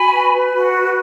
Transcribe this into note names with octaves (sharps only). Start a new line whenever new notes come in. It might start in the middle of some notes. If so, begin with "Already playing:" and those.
Already playing: F#4 G#5 B5
B4
B4
F#4
B4